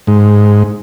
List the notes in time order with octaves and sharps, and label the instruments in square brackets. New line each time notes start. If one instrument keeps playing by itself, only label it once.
[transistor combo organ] G#2